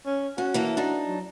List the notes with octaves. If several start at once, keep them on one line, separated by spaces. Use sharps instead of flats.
C#4
C#4 F#4
E3 A#3 A4
D4 D#4 F#4
F#3